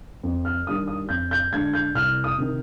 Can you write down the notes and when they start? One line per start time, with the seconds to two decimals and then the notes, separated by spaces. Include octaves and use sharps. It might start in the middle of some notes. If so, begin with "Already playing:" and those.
0.23 F2
0.45 F6
0.67 D#3 G3 D4 D#6
0.88 D#6
1.09 F2 G6
1.31 G6
1.52 D3 G#3 D4 G#6
1.74 G6
1.94 C2 F6
2.24 D#6
2.38 C3 D#3